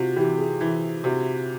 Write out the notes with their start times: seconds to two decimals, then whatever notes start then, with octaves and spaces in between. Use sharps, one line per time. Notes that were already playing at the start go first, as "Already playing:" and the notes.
Already playing: C3 F4 F#4
0.16 E3 G4
0.38 G#4
0.61 E3
1.04 C3 F#4